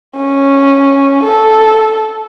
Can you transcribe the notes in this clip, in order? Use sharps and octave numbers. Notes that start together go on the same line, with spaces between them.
C#4
A4